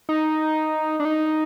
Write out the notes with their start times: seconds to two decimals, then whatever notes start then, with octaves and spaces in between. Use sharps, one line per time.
0.09 D#4
1.00 D4
1.05 D#4